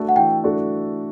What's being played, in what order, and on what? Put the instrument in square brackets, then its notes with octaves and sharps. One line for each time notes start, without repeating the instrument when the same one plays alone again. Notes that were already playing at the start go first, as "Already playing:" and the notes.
Already playing: [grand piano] A3 D4 F#4 A4
[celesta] F#5
[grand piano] E3 [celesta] G5
[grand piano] A3 D4 F#4 A4